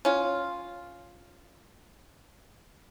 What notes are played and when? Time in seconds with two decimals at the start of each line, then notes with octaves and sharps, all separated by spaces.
0.05 C#4 F4